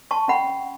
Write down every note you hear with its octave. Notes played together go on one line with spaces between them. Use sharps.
A5 C#6
C#4 F#5 B5